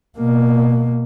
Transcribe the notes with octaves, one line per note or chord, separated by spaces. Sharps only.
B2 A#3